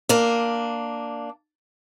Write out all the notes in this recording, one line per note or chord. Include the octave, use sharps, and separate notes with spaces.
A#3 D4